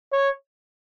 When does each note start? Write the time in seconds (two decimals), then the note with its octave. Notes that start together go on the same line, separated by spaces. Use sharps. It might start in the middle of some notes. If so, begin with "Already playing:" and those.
0.13 C#5